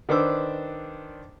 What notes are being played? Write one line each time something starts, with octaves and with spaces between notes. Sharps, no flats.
D#3 D4 B4 C5 D6 E6